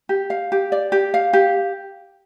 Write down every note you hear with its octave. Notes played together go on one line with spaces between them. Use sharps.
G4
F5
G4
D5
G4
F5
G4